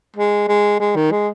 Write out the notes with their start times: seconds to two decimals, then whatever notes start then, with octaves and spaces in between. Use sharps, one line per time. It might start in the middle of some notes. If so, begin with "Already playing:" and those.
0.16 G#3
0.48 G#3
0.80 G#3
0.96 D#3
1.12 G#3